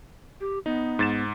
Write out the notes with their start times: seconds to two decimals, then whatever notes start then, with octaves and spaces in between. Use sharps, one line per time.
0.41 G4
0.66 B3 D#4
0.99 G#2 A6 E7